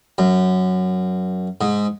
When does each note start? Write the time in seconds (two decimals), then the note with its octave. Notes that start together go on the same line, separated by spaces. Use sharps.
0.18 F#2
1.61 G#2